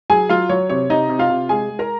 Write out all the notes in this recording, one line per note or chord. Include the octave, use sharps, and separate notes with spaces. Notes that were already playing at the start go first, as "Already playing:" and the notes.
F#3 G#4 G#5
F#3 F4 F5
F#3 C#5
C3 C#5
C3 D#4 D#5
C3
F4 F5
C3
G#3 G#4 G#5
G#3
A#4 A#5